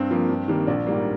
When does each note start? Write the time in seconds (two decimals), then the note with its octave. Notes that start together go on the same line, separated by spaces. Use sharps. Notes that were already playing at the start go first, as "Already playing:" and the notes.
Already playing: G2 C4
0.11 F3 A#3
0.30 G2
0.48 D#3 G3 A#3
0.67 A#1 D4
0.87 G#2 G3 A#3